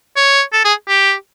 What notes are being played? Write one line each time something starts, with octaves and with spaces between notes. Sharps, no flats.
C#5
A4
G#4
G4